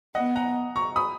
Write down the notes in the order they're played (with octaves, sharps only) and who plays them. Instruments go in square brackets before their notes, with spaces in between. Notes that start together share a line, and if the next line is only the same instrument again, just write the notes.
[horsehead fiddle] B3 [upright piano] D#5 F#5
[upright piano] F#5 A#5
A#5 C#6
B5 D#6